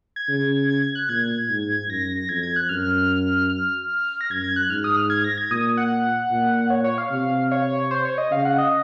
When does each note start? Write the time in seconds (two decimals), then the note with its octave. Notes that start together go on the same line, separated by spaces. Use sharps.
0.16 G#6
0.28 C#3
0.70 G#6
0.82 G#6
0.95 F#6
1.09 A#2 G#6
1.49 G#2
1.89 F#2 A#6
2.29 F2 G#6
2.43 G#6
2.56 F#6
2.69 F#2 F6
3.49 F6
4.21 A#6
4.31 F#2 G#6
4.44 G#6
4.56 F#6
4.70 G#2 F6
4.84 D#6
4.96 F6
5.10 G#6
5.24 A#6
5.38 G#6
5.51 A#2 D#6
5.77 F#5
6.31 A#2
6.70 C#5
6.84 C#5
6.98 F5
7.11 C3
7.52 C#5
7.91 C5
8.05 C#5
8.18 D#5
8.31 C#3 F5
8.45 F#5
8.58 D#5